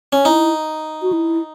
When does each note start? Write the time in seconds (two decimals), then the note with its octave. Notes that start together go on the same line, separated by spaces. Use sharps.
0.13 C#4
0.25 D#4 E4
1.02 F#4
1.13 E4